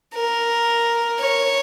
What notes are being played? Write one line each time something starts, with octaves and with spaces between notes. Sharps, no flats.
A#4
C#5